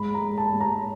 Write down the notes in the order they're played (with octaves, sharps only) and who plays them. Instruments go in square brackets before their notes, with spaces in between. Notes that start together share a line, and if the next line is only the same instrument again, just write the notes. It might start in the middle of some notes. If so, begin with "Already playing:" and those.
Already playing: [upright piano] G#2 B5
A#5
G#2
A5
G#2
A#5